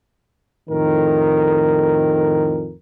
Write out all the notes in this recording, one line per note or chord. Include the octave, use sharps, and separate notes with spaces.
F2 A2 D#3 A#4